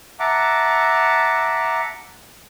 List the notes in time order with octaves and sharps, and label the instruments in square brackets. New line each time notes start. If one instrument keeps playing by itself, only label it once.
[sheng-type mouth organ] E5 F#5 A5 A#5 D6